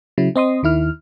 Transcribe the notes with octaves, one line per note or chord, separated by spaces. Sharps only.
C#3 F#3 E4
C4 D#5 C6 D#6
D#2 D#3 E4 F6